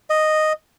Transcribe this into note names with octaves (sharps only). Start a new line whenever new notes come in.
D#5